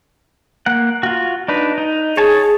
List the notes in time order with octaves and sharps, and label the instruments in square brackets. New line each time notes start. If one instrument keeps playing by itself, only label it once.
[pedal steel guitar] A#3 F#5
F4 F#4
D4 D#4 B4
D#4
[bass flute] G#4 [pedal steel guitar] C#5 G#5 A5